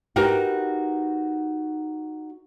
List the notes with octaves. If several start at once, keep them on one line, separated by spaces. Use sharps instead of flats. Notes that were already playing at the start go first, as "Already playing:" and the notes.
D#4 F#4 G4 A#4 B4